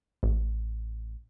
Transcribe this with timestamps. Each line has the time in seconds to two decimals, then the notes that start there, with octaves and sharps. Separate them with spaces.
0.23 A1